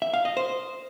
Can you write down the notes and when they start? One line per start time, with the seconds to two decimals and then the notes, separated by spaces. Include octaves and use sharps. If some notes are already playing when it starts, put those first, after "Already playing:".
0.02 E5
0.14 F5
0.25 D#5
0.37 C5